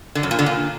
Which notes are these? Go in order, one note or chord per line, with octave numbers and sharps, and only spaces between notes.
D3
F#2
A#2
D3
A#2